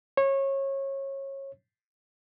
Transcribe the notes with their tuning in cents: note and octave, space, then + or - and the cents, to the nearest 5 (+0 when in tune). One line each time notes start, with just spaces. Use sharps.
C#5 -25